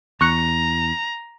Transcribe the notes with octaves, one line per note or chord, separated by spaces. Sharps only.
E2 A#5 C#6 F#6 C#7